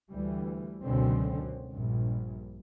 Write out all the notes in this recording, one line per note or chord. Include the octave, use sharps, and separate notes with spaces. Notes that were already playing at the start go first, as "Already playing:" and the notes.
D2 E3 G3
C#2 F#2 B2 D3 C4 C#4
A#1 G2